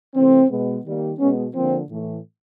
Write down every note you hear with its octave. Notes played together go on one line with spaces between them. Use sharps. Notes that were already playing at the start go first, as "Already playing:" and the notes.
C3 E3 A3 C4
B2 G#3 B3
D#3 G3 A#3
B2 G#3 B3 C#4
D3 F3 A#3 C4
A2 E3 A3